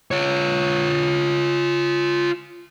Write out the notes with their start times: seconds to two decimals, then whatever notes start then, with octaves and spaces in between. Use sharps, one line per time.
0.11 F4 C#5